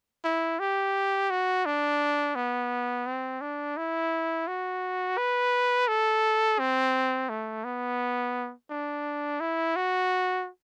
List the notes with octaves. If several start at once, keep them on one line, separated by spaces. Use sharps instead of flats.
E4
G4
F#4
D4
B3
C4
D4
E4
F#4
B4
A4
C4
A3
B3
D4
E4
F#4